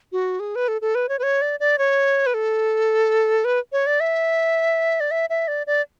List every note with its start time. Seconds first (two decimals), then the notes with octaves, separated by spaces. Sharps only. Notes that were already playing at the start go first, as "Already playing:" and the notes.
0.12 F#4
0.40 G#4
0.56 B4
0.68 A4
0.81 A4
0.95 B4
1.09 C#5
1.19 B4
1.23 C#5
1.42 D5
1.60 D5
1.78 C#5
2.26 B4
2.34 A4
3.45 B4
3.72 C#5
3.87 D5
4.00 E5
5.00 D5
5.11 E5
5.30 E5
5.48 D5
5.67 D5